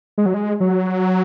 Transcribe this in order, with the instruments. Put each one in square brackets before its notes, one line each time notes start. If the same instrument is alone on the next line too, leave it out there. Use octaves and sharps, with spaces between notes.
[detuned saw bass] G#3
F#3
G#3
F#3